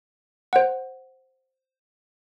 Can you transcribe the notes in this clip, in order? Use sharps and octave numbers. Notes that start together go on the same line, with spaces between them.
C5 F#5